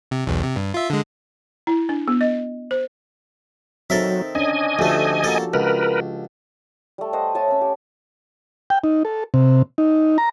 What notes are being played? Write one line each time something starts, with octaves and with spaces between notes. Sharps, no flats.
C3
B1 E2
C3
G2
F4 E5
D3 G#3
E4
D4
B3
D#5
C5
F#3 C4 D#4 A4 A#4 E5
C#4 D4 D#5 G#5
D2 F3 A3 G4 A4
A#3 F#4 A4
C#2 A#4 B4
G3 A3
C5 D#5 F#5
C#5 E5 A5 D#6
C#4 B5
G4
G5
D#4
A4
C3
D#4
A#5